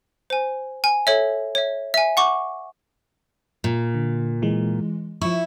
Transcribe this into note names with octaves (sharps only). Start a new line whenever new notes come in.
C5 G#5
G#5
A4 C#5 E5
C#5 E5
E5 G#5
F#5 C#6 D6
A#2
D3
E3 G#3
F3 E4 C#6